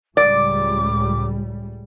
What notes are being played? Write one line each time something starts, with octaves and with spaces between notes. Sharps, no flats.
C#2 A2 G3 D5 D6